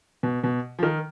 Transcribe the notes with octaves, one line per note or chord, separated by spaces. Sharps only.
B2
B2
F3
D#3